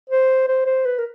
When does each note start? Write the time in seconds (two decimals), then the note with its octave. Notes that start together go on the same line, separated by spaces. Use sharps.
0.10 C5
0.48 C5
0.66 C5
0.86 B4
0.98 A#4